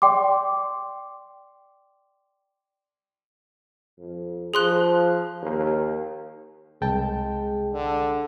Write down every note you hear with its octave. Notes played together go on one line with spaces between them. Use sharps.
D5 G5 C6 D6
F2
F3 G#4 C6 F#6
D#2
C2 G#3 G5 A5
D3